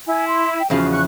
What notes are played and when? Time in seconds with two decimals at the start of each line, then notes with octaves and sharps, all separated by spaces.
0.07 E4 G#5
0.27 C6
0.59 G5
0.70 E2 C#3 F3 F#4 F5
0.91 C#6 F#6